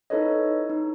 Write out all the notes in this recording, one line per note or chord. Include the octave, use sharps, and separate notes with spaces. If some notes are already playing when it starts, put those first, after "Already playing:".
D#4 E4 A4 B4 C#5 D#5
D#4